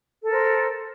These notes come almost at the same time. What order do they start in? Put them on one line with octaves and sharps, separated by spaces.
A4 A#4 C5